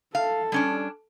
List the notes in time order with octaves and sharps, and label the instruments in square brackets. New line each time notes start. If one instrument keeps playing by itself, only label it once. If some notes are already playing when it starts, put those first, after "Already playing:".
[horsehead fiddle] A4 [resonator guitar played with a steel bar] F5
[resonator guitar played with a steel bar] G3 C#4 D4